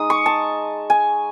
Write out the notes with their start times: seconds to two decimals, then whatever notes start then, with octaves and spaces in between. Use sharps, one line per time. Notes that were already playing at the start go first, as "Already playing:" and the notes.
Already playing: G#3 D#4 D#6
0.10 C#6
0.26 A5
0.90 G#5